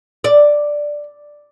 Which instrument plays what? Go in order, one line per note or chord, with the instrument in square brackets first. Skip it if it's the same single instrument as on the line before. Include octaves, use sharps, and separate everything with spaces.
[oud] D5